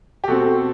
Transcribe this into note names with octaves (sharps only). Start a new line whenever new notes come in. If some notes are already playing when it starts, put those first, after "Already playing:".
G4
B2 A3 C4 F#4 A4